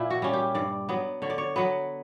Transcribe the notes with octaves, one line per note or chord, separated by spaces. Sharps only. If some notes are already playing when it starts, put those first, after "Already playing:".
Already playing: A#2 E4
F#4
G3 C#4
G4
G2 D5
F#3 B3
D3 C#5
D5
C#5
F#3 B3 B4